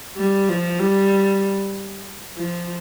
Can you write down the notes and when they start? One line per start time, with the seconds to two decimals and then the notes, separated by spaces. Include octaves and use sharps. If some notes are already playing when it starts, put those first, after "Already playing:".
0.17 G3
0.49 F3
0.79 G3
2.38 F3